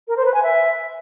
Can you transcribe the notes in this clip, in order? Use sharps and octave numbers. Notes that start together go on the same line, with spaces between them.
A#4
C5
B4
G#5
E5